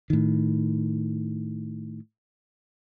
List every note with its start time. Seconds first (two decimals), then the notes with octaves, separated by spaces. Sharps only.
0.10 A2 D#3